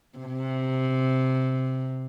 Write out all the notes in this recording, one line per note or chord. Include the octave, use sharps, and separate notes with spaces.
C3